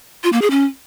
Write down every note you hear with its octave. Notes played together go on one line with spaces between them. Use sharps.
F4
A#3
G#4
C#4